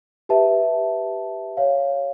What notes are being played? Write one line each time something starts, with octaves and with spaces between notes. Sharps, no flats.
G4 B4 E5 A5
C#5 F5